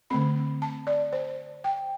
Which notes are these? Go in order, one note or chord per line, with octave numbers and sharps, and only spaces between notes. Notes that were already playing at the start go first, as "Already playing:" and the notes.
D3 A3 C4 B5
A5
D5
C5
G5